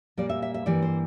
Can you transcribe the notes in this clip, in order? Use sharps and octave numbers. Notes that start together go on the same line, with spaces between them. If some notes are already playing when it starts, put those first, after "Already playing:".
A#2 G3 A#3 D5
E5
E5
E5
G2 E3 G3 A#3 D5
C5